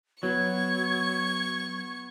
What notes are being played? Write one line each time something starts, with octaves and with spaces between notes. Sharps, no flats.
F#3 B3 C#6 G#6